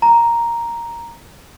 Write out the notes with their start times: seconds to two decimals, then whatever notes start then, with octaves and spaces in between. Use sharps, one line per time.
0.02 A#5